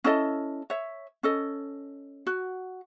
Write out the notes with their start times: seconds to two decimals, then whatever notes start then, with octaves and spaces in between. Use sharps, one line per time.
0.04 C#4 E4 A4 D#5
0.70 C#5 E5
1.23 C#4 A4 D#5
2.27 F#4